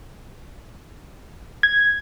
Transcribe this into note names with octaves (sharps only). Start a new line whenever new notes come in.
G#6